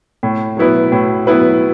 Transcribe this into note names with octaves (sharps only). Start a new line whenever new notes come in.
A2
F#3 B3 E4 B4
A2
F#3 B3 E4 B4